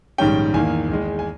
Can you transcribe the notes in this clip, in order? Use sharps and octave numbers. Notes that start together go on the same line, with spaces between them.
A#1 G#2 D#3 G3 C#4 G5
E2 D#3 A#3 G#5
E2 D#3 G#3
G#5